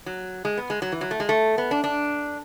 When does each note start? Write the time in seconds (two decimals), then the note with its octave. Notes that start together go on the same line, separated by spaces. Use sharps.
0.06 F#3
0.45 G#3
0.57 B3
0.70 G#3
0.82 F#3
0.92 E3
1.01 F#3
1.11 A3
1.20 G#3
1.29 A3
1.58 B3
1.71 D4
1.84 D4